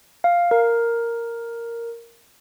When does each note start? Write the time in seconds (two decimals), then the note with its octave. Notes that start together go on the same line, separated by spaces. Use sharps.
0.24 F5
0.51 A#4